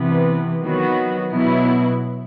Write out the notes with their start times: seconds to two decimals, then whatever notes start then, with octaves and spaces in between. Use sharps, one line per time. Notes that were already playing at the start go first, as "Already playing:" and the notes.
Already playing: C3 E3 B3
0.62 D#3 F#3 B3 F#4
1.32 B2 F#3 B3 E4